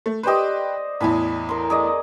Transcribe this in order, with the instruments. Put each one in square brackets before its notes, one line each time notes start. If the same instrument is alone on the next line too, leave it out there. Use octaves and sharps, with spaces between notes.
[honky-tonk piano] A3
[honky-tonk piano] G4 B4 [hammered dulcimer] C5 D5 D#5
[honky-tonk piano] E2 A2 [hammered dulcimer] G#5 A5 B5
[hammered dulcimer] A#4 C6
G#4 D5 D#5